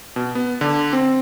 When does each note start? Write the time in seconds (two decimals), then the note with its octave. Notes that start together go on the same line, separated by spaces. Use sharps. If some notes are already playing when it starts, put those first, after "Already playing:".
0.16 B2
0.35 B3
0.61 D3
0.93 C4